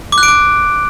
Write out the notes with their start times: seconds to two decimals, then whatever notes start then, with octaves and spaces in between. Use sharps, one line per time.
0.12 D6
0.18 F#6
0.23 D7
0.28 D6